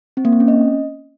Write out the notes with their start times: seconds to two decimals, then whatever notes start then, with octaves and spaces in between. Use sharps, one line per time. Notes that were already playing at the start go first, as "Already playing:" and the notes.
0.17 C4
0.25 A#3
0.33 C4
0.40 C#4
0.48 D#5